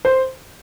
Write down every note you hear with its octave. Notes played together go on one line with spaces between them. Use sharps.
C5